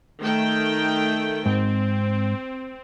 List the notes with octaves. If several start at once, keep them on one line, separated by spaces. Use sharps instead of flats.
D#3 A3 G5
G#2 C4